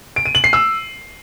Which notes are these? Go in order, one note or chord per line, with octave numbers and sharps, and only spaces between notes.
D7
D#7
F#7
C7
E6